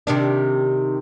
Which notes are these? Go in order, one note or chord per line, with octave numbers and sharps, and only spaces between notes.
C3 D#3 D4